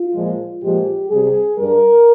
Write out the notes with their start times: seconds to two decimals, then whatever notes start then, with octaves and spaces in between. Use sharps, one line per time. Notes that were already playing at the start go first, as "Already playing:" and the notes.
Already playing: F4
0.15 A#2 F3 G#3
0.62 A#2 F3 G#3 G4
1.10 C3 G3 G#4
1.58 G2 G3 A#4